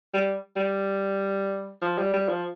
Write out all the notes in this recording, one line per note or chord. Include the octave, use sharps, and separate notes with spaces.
G3
G3
F3
G3
G3
F3